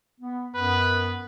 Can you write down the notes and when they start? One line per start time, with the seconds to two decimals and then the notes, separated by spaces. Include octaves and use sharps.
0.21 B3
0.55 F#2 B3 B4